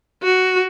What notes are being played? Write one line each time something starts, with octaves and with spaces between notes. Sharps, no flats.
F#4